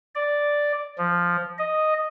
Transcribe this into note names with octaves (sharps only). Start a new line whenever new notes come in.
D5
F3
D#5